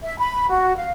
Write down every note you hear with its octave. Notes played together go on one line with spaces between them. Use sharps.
E5
B5
F#4
F5